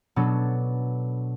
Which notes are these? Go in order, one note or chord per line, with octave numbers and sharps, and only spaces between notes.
B2 F#3 B3 D4 A4